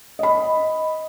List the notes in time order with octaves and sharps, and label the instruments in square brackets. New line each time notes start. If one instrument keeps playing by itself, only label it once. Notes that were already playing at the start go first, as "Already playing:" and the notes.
[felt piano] D#5 B5